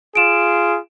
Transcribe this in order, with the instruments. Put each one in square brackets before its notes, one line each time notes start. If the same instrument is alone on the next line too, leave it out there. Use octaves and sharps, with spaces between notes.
[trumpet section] F4 G#4 [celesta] D7 E7